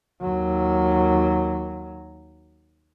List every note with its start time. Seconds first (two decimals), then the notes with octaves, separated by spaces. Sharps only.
0.22 D#2 F#3